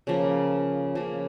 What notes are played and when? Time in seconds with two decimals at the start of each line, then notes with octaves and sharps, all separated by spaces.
0.07 C#3 F3 A#3
0.95 C#3 F3 A#3